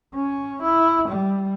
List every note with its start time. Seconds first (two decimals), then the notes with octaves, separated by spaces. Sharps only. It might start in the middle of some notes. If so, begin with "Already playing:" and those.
0.15 C#4
0.62 E4
1.08 G3